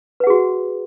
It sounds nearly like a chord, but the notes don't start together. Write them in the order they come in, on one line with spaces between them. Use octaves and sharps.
B4 F#5 G#4 F#4